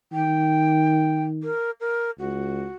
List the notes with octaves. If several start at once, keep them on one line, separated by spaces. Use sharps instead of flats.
D#3 G5
A#4
A#4
C#2 F#4